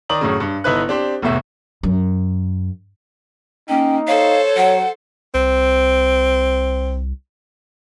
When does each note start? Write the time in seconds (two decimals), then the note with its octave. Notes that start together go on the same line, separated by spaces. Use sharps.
0.09 D#3 D5 A#5 D#6 F#7
0.21 F#2 A2 C#3
0.40 G2
0.64 G1 D#4 E4 B4 F#6
0.88 C4 D4 G4 C5
1.22 F1 E2 A2 E5
1.83 F#2
3.69 A#3 C#4 D#4 G5
4.08 A4 C5 C#5 F5
4.57 F#3 F#5
5.35 C2 C4